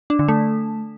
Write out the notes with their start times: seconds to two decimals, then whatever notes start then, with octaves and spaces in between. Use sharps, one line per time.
0.10 D4
0.19 D3
0.28 A3